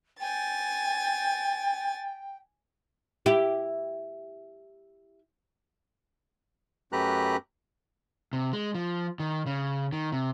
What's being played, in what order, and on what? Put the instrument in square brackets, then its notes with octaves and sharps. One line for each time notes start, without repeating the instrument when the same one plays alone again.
[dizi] G5 [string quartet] G#5 A6
[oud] E4 G4
[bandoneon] F#2 A3 G4 B4 A#5 F#6
[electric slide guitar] C3
G#3
F3
D#3
C#3
D#3
C3